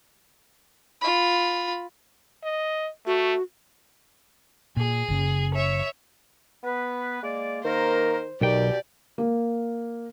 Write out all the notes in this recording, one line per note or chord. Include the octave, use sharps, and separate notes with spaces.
F4 B5
D#5
A3 F#4
A#2 G#4
F#1 C#3
C#5 E5
B3 B4
G#3 A#3 D5
D#3 A#3 A#4 C5
B1 B2 D#3 G4 D5 G5
A#3